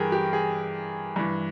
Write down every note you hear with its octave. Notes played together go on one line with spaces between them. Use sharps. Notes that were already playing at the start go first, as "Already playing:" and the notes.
Already playing: G2 E3 G4 G#4 A#4
G4
G#4
G2 E3